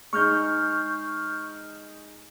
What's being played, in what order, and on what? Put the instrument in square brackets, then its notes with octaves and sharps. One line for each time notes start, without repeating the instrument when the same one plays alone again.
[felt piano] G#3 D#4 [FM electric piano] C#6 F6 G6